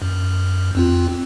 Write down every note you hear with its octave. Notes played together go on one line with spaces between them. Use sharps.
F#2
F2 C4 F4